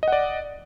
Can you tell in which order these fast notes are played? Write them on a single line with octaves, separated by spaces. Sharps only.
D#5 F#5 D5